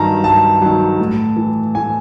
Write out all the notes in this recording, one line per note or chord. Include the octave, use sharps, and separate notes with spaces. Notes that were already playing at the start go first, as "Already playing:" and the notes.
Already playing: G2 D#3 F#3 A5 A#5
G2 A5
D#3 F#3
A2
E3
A2 G#5